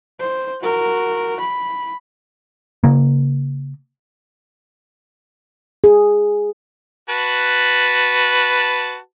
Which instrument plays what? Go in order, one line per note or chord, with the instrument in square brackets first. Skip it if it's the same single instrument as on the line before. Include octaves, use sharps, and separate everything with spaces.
[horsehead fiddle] C5
F#4 A#4
B5
[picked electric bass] C#3 A#3
[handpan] G#4
[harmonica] F#4 B4 A5